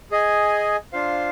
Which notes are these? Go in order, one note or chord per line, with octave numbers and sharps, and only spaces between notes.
G#4 D#5 G#5
D4 F4 C5 F5